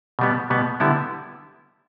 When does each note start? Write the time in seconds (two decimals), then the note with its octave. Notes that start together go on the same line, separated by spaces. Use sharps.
0.19 B2 G3 B3
0.50 B2 G3 B3
0.80 D3 G3 B3 E4